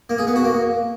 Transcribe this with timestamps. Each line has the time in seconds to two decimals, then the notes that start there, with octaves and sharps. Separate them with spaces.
0.10 A#3
0.18 G#4
0.27 B3
0.36 F#4
0.45 A#3